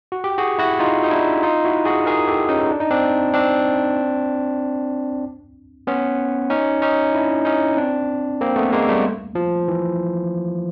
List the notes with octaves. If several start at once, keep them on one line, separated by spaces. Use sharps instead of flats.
F#4
G4
F#4 G#4
E4 F#4
D#4 F4
D#4
D4 E4
D#4 F4
E4 F#4
F#4 G#4
G#4 A#4
G4 A4
C#4 D#4
D4
D#4
C4 D4
C4 D4
B3 C#4
C#4 D#4
C#4 D#4
D4 E4
C#4 D#4
C4 D4
A#3 C4
A3 B3
G#3 A#3
G3 A3
F3
E3